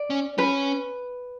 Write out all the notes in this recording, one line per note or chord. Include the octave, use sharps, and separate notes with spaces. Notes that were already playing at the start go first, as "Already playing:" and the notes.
Already playing: D5
C#4
C#4 B4